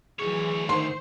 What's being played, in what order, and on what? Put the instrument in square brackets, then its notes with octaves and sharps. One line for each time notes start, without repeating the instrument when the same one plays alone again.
[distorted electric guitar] D2 C#5 [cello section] E3 F#3 [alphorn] G#4
[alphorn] D#3 [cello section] C5 [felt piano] C6